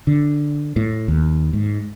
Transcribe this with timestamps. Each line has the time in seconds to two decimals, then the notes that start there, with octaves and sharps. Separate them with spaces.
0.07 D3
0.76 A2
1.08 D#2
1.53 G#2